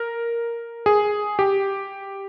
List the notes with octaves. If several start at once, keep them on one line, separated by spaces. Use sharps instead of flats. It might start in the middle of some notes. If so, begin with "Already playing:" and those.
Already playing: A#4
G#4
G4